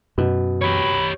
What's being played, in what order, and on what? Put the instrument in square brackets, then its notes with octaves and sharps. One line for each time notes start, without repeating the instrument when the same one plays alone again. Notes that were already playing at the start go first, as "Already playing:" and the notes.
[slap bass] F#2 [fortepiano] B2
[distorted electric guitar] G4 C#5 [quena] B5